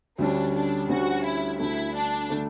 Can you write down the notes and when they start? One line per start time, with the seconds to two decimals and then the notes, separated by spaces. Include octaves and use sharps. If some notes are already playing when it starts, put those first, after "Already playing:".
0.18 D2 D3 G3 C#4 D4
0.54 D4
0.89 D2 D3 G3 C#4 F#4
1.25 E4
1.59 D2 D3 A3 E4
1.95 D4
2.30 D3 A3